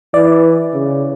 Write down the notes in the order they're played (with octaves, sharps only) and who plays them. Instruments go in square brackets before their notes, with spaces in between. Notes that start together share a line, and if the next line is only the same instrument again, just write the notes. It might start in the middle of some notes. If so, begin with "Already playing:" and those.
[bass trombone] E3 [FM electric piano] D5
[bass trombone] C#3